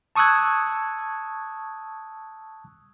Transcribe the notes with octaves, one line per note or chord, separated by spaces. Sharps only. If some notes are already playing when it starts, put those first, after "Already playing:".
A5 C#6 D#6 E6 F#6 G#6